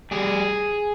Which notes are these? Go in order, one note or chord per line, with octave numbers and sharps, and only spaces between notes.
G3 G#4